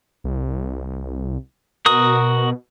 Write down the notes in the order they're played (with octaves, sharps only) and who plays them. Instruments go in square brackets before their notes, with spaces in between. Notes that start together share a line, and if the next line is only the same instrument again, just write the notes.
[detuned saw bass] C2
[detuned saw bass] B2 [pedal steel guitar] F#4 A#4 D#6